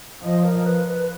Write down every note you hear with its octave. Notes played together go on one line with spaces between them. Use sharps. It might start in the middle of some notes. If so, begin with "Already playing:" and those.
F3 D#5
A#4
B4
B4